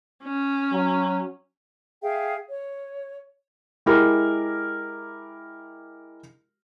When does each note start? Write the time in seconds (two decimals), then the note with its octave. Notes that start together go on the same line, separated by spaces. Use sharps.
0.24 C#4
0.73 F#3
2.02 G#4 E5 F5 G5
2.50 C#5
3.86 G#3 E4 G4 A#4